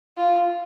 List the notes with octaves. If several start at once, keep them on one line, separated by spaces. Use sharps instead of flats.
F4